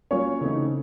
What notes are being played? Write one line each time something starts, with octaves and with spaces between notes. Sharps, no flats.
F#3 A#3 C#4 F4 C#5 C#6
C#3 E3 A3 C4 D#4